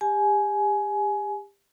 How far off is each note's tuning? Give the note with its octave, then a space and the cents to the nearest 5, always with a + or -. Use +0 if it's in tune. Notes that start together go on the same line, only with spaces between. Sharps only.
G4 +35 G#5 +20